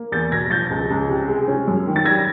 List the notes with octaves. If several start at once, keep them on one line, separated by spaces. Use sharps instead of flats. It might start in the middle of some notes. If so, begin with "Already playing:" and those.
Already playing: A#3
E2 G6 A6
B2 G#6 A#6
F3 G6 A6
C#2
C#2
C3
G#3
C#4
F#2
D#3
A6
G3 G#6 A#6